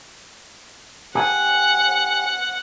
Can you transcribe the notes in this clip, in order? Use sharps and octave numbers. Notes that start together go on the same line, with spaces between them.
G4 F#5 G#5